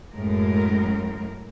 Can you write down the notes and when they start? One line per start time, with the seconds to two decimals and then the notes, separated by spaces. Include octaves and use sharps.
0.13 F#2 A2 G#3 A#4